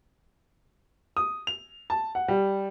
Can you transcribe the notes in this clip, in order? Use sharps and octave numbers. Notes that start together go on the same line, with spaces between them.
D#6
F7
A5
F#5
G3